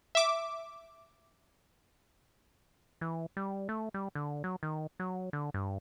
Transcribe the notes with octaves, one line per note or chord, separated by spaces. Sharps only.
E5 D6
E3
G3
A3
G3
D3
F#3
D#3
F#3
D3
G2